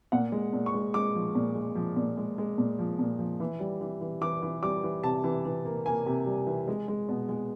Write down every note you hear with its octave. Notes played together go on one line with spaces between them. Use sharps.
A#2 F#5
G#3
A#2
C#6
G#3
G#3 D6
F3
A#2
G#3
F3
A#2
G#3
G#3
A#2
F3
A#2
F3
E3
G3
E3
E3
E3 D6
E3
G3 D6
E3
C3 A5
E3
E3
A#3
A#3 G#5
C3
G3
E3
G#3
G#3
B2
G#3